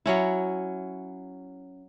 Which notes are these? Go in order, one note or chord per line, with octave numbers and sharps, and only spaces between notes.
F#3 C#4 E4